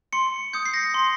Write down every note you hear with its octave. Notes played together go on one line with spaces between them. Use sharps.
C6 C#7
D#6 G6 C#7
C7
A#6
C6